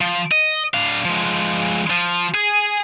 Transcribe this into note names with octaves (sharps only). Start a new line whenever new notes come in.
F3
D#5
D4 F5
F3 G#3
F3
G#4